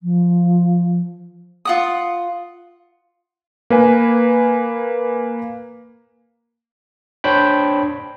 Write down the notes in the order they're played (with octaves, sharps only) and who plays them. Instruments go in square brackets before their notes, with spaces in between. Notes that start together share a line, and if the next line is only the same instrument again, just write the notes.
[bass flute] F3
[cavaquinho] F4 F#5 D#6
[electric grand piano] A#3 B4 G#5
[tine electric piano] D4 C5 C#5 G5 B5